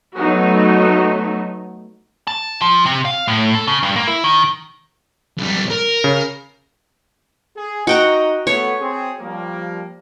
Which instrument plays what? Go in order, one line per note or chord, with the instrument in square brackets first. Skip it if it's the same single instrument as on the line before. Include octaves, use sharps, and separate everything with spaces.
[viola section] F#3 A3 B3 D#4 F#4
[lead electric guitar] A5
F3
C3
F5
A2
A4
C#3
G2
A#3
E4
D#3
[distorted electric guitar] B1 G3
A#4
[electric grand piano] C#3
[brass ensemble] G#4
[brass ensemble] D#4 D#5 [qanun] F#4 G5 A#5
[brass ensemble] A3 B3 [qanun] C#5
[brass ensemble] C4 G#4
F3 G3 A#3